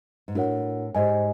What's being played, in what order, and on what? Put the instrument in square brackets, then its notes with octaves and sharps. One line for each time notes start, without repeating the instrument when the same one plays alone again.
[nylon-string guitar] G#2
[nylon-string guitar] A2 [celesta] D4 F#4 A#4 C#5 F#5
[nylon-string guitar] G#2 [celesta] G4 C5 D#5 G#5